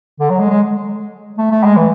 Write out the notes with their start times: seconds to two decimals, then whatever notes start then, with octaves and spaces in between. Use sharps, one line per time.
0.20 D3
0.30 F#3
0.39 G#3
0.50 G#3
1.38 A3
1.51 A3
1.64 G#3
1.77 E3